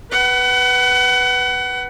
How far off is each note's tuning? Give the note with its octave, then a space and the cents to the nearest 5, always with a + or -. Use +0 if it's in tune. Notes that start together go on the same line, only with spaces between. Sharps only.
B4 +0 F#5 +30